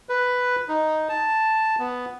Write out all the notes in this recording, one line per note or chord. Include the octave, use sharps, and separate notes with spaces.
B4
D#4
A5
B3